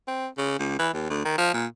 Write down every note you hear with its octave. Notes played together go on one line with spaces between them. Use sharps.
C4
C#3
C#2
E3
D#2
D2
D#3
F3
A#2